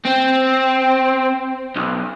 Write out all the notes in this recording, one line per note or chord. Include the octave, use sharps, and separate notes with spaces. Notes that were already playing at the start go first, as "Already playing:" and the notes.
C4
B1